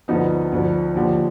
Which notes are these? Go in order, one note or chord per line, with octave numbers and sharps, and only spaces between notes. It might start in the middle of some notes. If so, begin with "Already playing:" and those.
D2 D3 F3 B3 D#4
D2 D3 F3
D#2 D3 F3